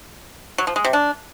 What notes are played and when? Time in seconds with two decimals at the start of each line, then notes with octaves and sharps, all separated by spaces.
0.58 F#3
0.67 F3
0.76 G#3
0.85 C3
0.93 D4